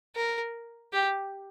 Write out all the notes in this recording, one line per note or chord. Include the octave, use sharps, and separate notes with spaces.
A#4
G4